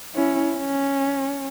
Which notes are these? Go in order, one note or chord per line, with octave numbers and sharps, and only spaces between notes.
C#4 E4
C#4